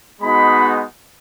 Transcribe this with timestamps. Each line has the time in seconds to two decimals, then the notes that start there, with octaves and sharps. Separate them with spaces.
0.21 G#3 B3 D#4 F#4 B5